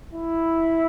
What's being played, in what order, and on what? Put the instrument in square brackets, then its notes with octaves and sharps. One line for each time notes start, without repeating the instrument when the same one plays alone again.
[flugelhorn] E4